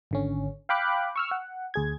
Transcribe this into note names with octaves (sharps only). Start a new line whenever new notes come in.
G#1 D3 C#4
F5 G5 B5 D6 F#6
C#6 E6 F6
F#5
D2 G#4 G#6